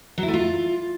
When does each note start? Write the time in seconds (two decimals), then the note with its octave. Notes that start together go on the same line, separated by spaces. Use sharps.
0.18 F#3
0.23 E4
0.28 A3
0.34 F4